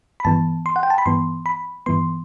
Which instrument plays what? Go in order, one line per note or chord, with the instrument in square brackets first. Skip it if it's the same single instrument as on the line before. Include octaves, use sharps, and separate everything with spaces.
[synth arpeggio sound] B5
G2 E3 B3 A5
C6
F#5
G5
A5
B5
G2 E3 B3 C6
B5
G2 E3 B3 C6